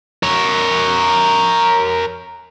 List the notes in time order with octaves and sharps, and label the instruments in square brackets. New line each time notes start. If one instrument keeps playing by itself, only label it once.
[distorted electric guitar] A#4 C#5